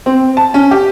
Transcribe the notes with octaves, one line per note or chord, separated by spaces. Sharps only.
C4
A5
C#4
G4